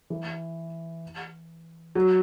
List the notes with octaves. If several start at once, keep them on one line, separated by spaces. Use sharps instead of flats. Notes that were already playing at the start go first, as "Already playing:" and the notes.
E3
F#3